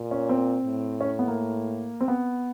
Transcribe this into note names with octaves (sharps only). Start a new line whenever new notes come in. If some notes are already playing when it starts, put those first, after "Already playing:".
Already playing: A#2
C#4
C4
A2
C#4
B3
A#3
C4
B3